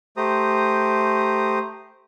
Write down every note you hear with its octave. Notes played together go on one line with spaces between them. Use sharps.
A3 G4 C5 A#5 D#6